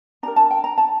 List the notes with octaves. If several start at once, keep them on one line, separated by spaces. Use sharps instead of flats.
D4 G4 A#4 A#5
A5
G5
A#5
A5